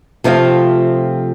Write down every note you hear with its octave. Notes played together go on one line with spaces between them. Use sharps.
C3 F3 A3 C4 F4